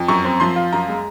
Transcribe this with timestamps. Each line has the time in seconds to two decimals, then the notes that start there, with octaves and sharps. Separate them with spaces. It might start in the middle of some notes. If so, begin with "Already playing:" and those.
Already playing: F2
0.08 F#2 C#6
0.25 C4
0.40 F3 C6
0.56 F4
0.72 F#2 A#5
0.89 G#3